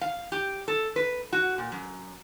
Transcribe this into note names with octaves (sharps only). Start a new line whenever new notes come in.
F5
G4
A4
B4
F#4
A#2
F#2